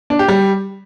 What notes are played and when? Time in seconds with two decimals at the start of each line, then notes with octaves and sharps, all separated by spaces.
0.10 D4
0.19 G4
0.28 G3